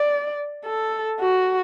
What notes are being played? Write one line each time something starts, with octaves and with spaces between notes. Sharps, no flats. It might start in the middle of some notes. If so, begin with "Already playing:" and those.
Already playing: D5
A4
F#4